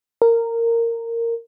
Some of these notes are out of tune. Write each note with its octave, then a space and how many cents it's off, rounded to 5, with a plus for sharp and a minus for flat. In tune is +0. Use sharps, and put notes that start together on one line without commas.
A#4 -15